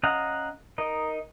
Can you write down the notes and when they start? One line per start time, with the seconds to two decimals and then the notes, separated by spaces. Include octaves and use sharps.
0.03 C#4 D#5 F5 F#5 A#5
0.78 D#4 A#4 D#5